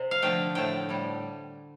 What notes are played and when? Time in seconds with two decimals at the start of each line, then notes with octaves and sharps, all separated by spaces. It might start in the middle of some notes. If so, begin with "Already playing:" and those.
Already playing: C3 C5
0.11 F5
0.22 D3 F3 A3 G5
0.55 A2 F3 A3 G5
0.89 A2 G3